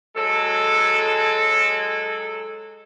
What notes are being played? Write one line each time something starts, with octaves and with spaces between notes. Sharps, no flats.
F#3 G#3 A4